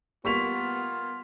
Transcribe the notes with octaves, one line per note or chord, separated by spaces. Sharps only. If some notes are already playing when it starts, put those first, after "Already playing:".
G3 A#3 B3 F4 C#6 B6 F7